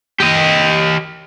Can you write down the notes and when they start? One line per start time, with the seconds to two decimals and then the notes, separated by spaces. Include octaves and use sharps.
0.20 G4 D#5